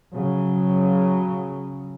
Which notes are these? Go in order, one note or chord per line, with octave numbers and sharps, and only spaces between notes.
C#3 F#3